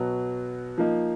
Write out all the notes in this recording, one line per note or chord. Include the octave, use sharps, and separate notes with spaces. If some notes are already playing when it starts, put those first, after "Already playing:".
Already playing: B2 F#3 B3
F3 A#3 D#4